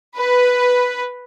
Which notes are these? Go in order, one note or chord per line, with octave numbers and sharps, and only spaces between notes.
B4